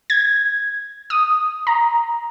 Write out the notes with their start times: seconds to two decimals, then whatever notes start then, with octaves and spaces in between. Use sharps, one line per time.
0.10 G#6
1.10 D#6
1.67 A#5